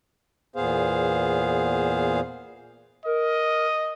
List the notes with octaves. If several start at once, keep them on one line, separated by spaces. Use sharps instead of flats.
E2 A#2 B3 G#4 C5 F5
A#4 D#5